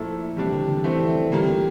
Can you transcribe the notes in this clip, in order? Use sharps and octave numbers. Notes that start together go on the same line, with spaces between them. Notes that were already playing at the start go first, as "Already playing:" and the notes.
Already playing: A#2 F3 A3 E4 A4
C3 E3 G3 D4
D3
D3
D3
E3 A3 C4 E4
E3
E3
A#2 D3 G3 A#3
E3